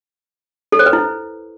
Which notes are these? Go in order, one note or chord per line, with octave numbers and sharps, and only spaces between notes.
A4
C5
B4
E4